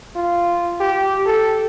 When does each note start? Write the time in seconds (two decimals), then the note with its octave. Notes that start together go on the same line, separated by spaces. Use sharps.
0.16 F4
0.80 G4
1.26 A4